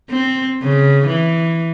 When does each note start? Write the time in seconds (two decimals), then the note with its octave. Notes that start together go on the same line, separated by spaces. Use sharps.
0.10 C4
0.63 C#3
1.07 E3